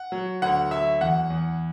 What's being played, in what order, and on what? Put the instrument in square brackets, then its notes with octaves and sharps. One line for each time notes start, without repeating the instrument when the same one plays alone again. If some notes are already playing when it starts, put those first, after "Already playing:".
Already playing: [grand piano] F#5
F#3
D2 F#5
F#3 E5
E2 F#5
E2